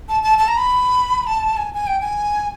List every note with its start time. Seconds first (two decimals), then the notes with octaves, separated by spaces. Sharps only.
0.09 A5
0.23 A5
0.38 A5
0.48 A#5
0.57 B5
1.27 A5
1.57 G#5
1.74 G#5
1.87 G5
2.01 G#5